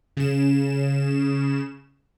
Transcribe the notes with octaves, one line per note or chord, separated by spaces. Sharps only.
C#3 E7